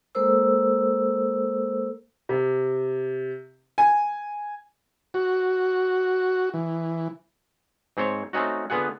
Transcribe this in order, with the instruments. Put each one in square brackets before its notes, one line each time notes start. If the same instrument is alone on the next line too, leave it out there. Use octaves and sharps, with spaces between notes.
[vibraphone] G#3 A#3 A4 A#4 C5 E6
[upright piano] C3
G#5
[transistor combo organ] F#4
E3
[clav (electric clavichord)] G#2 C4 C5 C#5
A3 C4 C#4 D#4 F#4
D3 B3 F4 G#4 F#5